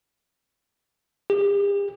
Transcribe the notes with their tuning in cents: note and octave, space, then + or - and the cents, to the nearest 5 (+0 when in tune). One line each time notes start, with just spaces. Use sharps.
G4 +45